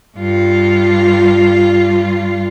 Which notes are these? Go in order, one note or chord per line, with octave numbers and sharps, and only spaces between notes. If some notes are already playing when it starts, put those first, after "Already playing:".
G2 F4